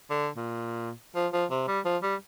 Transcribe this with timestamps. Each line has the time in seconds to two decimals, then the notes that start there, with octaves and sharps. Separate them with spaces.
0.10 D3
0.36 A#2
1.15 F3
1.33 F3
1.50 C3
1.68 G3
1.85 F3
2.03 G3